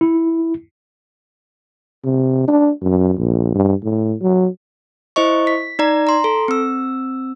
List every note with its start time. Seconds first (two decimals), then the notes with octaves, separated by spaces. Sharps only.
0.01 E4
2.04 C3
2.48 D4
2.82 F#2
3.18 A#1
3.54 G2
3.84 A2
4.21 F#3
5.16 E4 C5 D#5 C#6
5.47 B6
5.79 D#4 D5 A#5
6.07 A#5 C6
6.24 A4
6.48 C4 E6